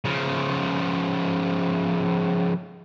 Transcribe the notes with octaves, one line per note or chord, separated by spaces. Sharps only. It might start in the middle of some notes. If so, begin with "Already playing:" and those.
C#3 F3